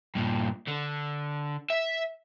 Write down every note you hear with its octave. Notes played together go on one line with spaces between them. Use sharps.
G2 A#2
D3
E5